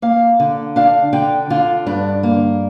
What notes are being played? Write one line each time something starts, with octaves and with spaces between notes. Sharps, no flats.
A#3 F5
D3
D4 F5
D3 G5
D3 F4
G2 D4
A#3